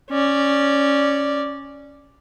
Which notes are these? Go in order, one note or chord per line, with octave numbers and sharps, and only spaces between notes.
C#4 D5